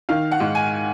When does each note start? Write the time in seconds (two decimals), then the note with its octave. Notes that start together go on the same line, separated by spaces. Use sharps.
0.09 D#3 F5
0.31 F#5
0.40 G#2
0.55 G#5